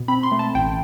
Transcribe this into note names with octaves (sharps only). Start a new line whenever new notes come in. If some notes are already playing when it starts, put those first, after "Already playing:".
Already playing: B2
C4 B5
C6
A3
A5
A1 G5